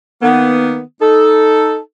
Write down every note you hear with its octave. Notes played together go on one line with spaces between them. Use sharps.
D#3 A#3 B3
D#4 A4